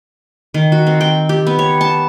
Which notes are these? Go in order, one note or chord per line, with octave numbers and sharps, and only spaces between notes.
D#3
F#4
C4
G5
G4
B3
C#5
A5